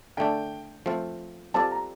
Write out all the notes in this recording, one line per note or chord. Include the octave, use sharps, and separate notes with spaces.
D3 A3 D4 G5
F3 A3 C4 F4
G3 C4 F4 A4 D5 A5
A#5